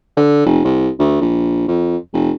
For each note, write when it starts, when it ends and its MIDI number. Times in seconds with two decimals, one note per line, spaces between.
0.17 0.45 50
0.46 0.61 29
0.64 0.89 36
0.99 1.19 38
1.21 1.65 34
1.68 1.97 41
2.14 2.31 29